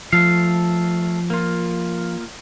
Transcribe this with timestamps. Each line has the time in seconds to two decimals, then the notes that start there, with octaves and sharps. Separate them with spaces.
0.13 F3 A3 A4 F5
1.30 A#3 F4